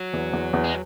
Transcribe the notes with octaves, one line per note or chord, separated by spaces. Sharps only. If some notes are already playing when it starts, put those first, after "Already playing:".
Already playing: F#3
E2
E2
E2
G#3